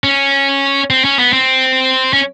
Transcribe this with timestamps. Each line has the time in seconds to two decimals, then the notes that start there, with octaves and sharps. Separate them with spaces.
0.04 C#4
0.90 C4
1.05 C#4
1.19 B3
1.33 C4
2.13 C#4